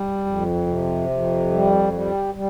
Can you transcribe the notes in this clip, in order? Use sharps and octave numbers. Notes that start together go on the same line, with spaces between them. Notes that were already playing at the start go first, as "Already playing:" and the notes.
Already playing: G3
F2
C3
F2
G3
G3
G3